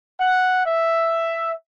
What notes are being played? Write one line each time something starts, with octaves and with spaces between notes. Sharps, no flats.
F#5
E5